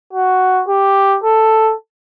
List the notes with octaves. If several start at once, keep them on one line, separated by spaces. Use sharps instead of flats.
F#4
G4
A4